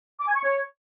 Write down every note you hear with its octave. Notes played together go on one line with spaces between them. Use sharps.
D6
G#5
C#6
C#5